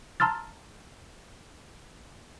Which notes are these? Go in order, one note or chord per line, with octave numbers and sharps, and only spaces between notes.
A5 A#5 C6 E6 F6 A6